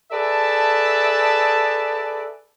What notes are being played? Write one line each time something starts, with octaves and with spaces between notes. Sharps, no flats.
G#4 A4 B4 D5 E5 A5